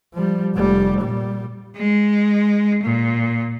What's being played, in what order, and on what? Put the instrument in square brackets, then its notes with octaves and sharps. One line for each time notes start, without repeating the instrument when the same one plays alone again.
[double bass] F3 G3
F1 G3
A#2 G3
[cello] G#3
A#2